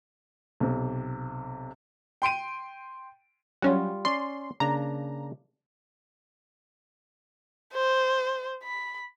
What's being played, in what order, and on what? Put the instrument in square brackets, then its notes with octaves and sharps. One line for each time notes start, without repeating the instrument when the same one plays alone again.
[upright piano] B1 C3
[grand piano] G5 C6 D7 D#7
[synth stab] F#3 C#4 F#4 [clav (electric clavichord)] G3 F4
[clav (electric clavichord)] C#4 D5 [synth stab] C6
[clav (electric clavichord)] C#3 A#3 D4 [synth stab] A#5
[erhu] C5
B5